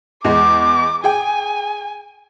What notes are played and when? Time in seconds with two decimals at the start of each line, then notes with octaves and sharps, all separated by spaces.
0.24 E2 G#3 D6
1.04 G#4 G5 G#5